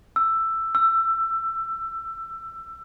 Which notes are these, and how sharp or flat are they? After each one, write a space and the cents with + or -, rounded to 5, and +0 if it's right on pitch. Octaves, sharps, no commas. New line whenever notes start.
E6 +10
E6 +20